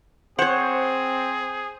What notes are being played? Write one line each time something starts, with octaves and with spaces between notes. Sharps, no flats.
C4 G#4 C5 C#5 F#5